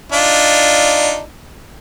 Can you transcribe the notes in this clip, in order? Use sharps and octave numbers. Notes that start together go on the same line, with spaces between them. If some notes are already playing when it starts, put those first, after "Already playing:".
D4 D#4 F4